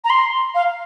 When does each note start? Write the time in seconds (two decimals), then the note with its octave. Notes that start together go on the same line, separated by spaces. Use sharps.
0.04 A#5
0.10 C6
0.55 F5